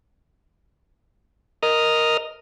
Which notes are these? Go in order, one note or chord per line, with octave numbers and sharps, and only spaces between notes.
A#4 D#5 D#6 F6